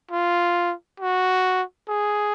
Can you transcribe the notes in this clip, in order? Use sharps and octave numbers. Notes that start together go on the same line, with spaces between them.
F4
F#4
G#4